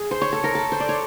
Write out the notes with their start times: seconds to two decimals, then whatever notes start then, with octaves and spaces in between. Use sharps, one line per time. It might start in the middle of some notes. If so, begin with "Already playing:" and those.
Already playing: G#4
0.11 C5
0.22 C#5
0.33 A4
0.44 A#4
0.55 A4
0.72 C5
0.80 D5
0.89 C#5